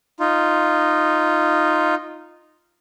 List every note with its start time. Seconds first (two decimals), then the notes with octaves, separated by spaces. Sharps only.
0.20 D#4 F4